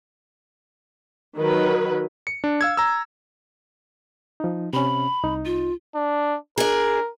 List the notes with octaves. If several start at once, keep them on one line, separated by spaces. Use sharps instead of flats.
D#3 F#3 B4
C#7
D4
F5 E6 G#6
A#5 E6
F3 D#4
C3 C#4 B5
C2 D#4
F4
D4
D4 G#4 A#4